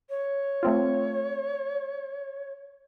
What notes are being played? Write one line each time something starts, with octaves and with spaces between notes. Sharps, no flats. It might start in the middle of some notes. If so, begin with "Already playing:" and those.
C#5
A3 C4 F4